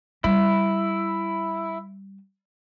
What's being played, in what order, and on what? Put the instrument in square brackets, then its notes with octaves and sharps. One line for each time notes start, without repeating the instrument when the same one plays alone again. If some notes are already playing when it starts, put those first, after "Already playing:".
[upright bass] G3 [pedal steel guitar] E4